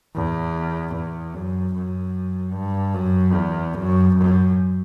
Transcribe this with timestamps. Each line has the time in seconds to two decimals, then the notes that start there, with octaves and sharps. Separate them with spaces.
0.15 E2
0.94 E2
1.34 F#2
1.74 F#2
2.54 G2
2.95 F#2
3.35 E2
3.75 F#2
4.15 F#2